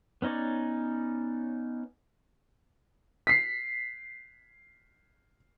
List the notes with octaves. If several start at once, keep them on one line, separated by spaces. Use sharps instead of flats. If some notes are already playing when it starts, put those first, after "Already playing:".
B3 C#4 D#4 C#5 D5
B6 C7